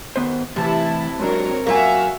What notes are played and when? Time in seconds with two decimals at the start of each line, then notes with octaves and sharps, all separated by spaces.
0.16 D#3 B3 C5
0.56 A2 C3 E3 E4 A5
1.19 G#2 F#3 C4 D4 A#4 C#5
1.67 F#2 A#3 F4 F#4 E5 F5 G#5